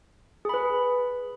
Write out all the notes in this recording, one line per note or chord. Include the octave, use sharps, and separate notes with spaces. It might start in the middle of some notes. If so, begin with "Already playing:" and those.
G#4 B4 B5